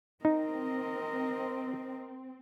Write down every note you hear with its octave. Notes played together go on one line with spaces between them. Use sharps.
C4 D#4 A#4 D#5